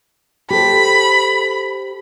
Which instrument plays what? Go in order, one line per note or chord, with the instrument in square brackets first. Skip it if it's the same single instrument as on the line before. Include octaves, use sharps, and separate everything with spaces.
[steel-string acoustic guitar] G4 A4 C5 [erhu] B5